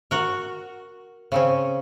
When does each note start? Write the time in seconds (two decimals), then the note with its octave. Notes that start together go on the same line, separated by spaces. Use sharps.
0.11 F#4 A#4
1.32 C#3 C4 C#4